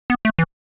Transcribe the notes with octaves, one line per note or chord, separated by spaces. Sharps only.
B3
A3
E3